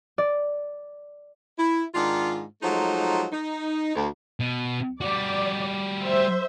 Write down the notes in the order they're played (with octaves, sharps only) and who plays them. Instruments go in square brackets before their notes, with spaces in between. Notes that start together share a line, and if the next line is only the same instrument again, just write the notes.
[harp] D5
[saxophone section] E4
G#2 D#3 D4 F4
F3 F#3 G#3 A3 D#4
D#4
D2
[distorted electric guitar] B2
[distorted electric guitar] G3 F#4 [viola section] D5
[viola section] C5 E5